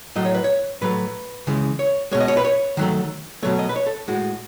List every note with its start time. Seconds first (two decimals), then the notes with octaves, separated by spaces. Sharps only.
0.16 A2 F#3 A3 D#5
0.25 C#5
0.35 B4
0.44 C#5
0.81 A2 F#3 A3 B4
1.47 C#3 E3 G#3
1.79 C#5
2.12 B2 G#3 C#5
2.20 D#5
2.28 C#5
2.37 B4
2.45 C#5
2.77 D#3 F#3 A3
3.43 B2 F#3 A3 C#5
3.59 D#5
3.69 B4
3.76 C#5
3.87 A4
4.08 A2 G#3 F#4